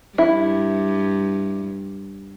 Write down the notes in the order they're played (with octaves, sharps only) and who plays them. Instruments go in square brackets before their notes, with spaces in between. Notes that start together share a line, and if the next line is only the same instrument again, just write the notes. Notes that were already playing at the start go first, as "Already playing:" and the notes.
[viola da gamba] G2 [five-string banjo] E4